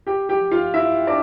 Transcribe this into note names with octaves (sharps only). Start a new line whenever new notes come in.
G4 G5
G4 G5
F4 F5
E4 E5
D4 D5